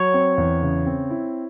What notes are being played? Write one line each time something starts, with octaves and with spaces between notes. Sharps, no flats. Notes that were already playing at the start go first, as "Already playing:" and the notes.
Already playing: F#3 C#5
C4
E2
C#3
C4
E4